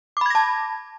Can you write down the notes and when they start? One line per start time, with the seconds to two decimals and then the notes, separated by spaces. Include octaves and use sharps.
0.17 D6
0.21 B5
0.26 G#6
0.30 A#6
0.35 A5